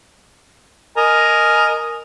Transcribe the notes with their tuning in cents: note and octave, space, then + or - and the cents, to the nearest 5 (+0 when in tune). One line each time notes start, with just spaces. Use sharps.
A#4 +0 D#5 +0 G#5 +15